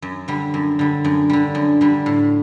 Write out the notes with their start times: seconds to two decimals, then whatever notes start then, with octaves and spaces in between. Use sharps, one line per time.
0.02 F#2
0.28 D3 G3
0.54 F#2
0.79 D3 G3
1.05 F#2
1.30 D3 G3
1.55 F#2
1.81 D3 G3
2.06 A2